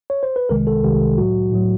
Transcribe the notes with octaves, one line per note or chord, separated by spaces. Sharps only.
C#5
C5
B4
C2 C3 D#3 G#3 A#4
A4
C2 C3 D#3 G#3 G4
A2 F#3 F#4
A2 F#3